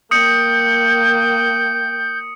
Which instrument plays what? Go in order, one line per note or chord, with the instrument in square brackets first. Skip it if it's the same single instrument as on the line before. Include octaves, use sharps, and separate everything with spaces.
[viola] A#3 G5 [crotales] D#6 C#7 [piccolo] G6